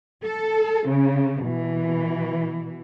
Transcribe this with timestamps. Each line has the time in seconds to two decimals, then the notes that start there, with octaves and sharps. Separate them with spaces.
0.21 A4
0.87 C#3
1.43 B2 E3